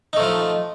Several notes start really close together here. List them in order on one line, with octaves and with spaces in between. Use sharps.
D#4 A3 F3